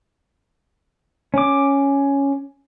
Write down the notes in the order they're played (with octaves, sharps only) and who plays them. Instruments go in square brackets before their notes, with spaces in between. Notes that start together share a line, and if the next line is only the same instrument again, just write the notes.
[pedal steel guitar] C#4 D6